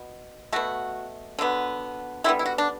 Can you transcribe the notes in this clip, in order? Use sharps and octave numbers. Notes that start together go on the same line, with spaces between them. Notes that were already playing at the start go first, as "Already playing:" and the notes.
Already playing: B2
B2 A3 F#4
D3 F#3 B3
D3 G3 B3 E4
E4
F#4
D4